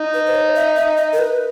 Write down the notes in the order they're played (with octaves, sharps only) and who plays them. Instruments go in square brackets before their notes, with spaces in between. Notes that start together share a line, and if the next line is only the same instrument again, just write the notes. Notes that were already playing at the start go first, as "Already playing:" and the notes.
Already playing: [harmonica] D#4
[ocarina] B4
C5
C#5
E5
E5
D#5
A#4
B4